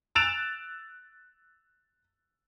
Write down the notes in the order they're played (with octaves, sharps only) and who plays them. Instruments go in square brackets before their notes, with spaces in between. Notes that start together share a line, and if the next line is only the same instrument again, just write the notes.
[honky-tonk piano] E6 F#6 A6 D7 E7 F7